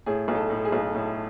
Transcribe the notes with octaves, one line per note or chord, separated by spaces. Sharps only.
A2 G#4
B1
A4
A2
G#4
B1
A2